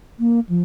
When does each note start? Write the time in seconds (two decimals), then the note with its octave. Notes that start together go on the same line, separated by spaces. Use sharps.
0.20 A#3
0.49 F3